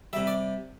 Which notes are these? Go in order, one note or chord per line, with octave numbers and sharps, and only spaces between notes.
C3 G3 E5
D5